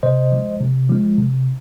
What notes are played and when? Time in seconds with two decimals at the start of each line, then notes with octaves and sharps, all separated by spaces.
0.03 C3 C5 D#5
0.32 F3 G#3
0.60 C3
0.89 F3 G#3
1.18 C3